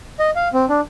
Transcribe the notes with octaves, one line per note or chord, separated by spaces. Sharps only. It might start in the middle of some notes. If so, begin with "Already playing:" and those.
D#5
F5
C4
D4